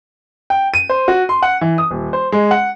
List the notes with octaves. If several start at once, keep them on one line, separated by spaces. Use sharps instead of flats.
G5
D#7
C5
F#4
C6
F#5
E3
D#6
D#1
C5
G#3
F#5